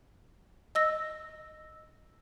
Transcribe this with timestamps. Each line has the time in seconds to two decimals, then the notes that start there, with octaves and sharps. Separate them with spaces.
0.75 D#5 E6 A#6